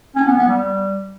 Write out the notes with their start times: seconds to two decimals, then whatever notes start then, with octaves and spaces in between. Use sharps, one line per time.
0.16 C#4
0.27 B3
0.37 B3
0.48 G3